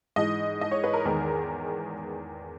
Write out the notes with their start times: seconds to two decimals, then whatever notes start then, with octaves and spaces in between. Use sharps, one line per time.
0.16 G#2 E3 G#3 D#5
0.61 D#5
0.71 C#5
0.84 B4
0.93 A#4
1.05 E2 D#3 G#3